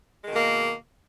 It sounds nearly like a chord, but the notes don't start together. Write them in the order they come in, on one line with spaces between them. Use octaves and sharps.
G#3 D#3 B2 A#3